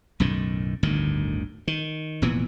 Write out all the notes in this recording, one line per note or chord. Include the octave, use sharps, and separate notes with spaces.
B1 F#2 A2 D#3
G1 D2 A2 D#3
D#3
F1 A#2 E3 B3